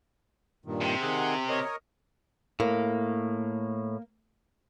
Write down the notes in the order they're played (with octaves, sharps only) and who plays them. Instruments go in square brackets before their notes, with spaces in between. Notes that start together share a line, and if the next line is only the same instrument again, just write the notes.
[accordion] G2 A#2 D#3
[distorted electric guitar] C3
[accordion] D#3 G#4 F#5
A#4 C#5 D#5
[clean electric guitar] A2 [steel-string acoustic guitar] A#3